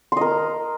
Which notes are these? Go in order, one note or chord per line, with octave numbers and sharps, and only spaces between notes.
A#4 D#5 C6